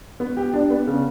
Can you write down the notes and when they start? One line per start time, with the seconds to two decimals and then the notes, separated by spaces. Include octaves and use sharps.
0.20 B3
0.37 G4
0.54 D4
0.70 B3
0.87 C#3